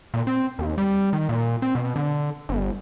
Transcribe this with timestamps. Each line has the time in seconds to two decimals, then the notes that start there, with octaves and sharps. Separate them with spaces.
0.14 A#2
0.27 C4
0.59 D#2
0.78 G3
1.13 D#3
1.29 A#2
1.62 C4
1.75 B2
1.96 D3
2.49 G1